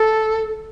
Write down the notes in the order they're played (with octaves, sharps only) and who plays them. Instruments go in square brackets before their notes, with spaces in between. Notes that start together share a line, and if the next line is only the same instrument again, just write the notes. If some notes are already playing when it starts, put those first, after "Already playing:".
Already playing: [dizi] A4